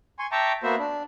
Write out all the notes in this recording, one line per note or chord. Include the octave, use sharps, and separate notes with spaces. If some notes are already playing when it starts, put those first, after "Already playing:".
G#5 C6 C#6
E5 G5 A5 A#5 C#6 D6
A#3 B3 F#4 C5 E5
D4